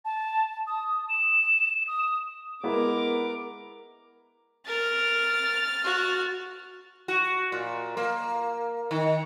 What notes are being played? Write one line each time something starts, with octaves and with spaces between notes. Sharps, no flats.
A5
D#6
E7
D#6
G#3 B3 E4 A#4 D6
A#4 F6 A6
F#4
F#4
A#2
A#3
D#3